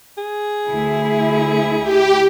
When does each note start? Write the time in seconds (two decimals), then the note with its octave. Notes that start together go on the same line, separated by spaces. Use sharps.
0.18 G#4
0.68 D2 E4
1.82 G4